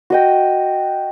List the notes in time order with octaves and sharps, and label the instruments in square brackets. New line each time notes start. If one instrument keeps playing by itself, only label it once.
[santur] F#4 D#5 G5